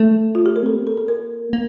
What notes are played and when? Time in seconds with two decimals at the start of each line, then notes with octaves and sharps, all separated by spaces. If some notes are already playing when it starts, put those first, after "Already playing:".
Already playing: A3
0.35 F4
0.46 G4
0.56 A#4
0.63 C4 A4
0.77 A#3
0.87 A4
0.97 A4
1.08 A#4
1.53 A#3